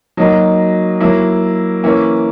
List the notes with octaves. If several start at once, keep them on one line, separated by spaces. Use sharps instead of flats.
F#3 A#3 D#4 F#4
F#3 A#3 E4
E3 A#3 C#4